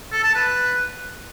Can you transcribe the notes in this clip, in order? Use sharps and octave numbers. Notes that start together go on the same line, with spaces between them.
A4
A5
B4